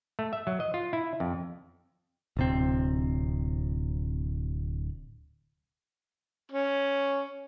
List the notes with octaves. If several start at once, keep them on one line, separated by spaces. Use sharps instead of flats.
A3
E5
F#3
D#5
F4
E4
F2
D1 C3 C4
C#4